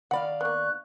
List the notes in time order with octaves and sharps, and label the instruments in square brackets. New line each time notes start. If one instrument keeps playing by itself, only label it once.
[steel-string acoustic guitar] D#3 D5 F5 [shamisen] F#5 B5
[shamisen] A#3 B3 [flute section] C#6 F#6